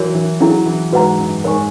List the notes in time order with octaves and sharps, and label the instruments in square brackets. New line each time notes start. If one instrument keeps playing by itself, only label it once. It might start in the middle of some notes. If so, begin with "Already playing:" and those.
Already playing: [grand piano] E3 F#3 [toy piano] F#4 A#4 C#5
[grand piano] E3
[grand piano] F#3 [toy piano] C#4 E4 G#4
[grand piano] E3
[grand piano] G#2 [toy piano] F#4 B4 F#5 A#5
[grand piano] F#2
[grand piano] G#2 [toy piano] A#4 C#5 G#5 C#6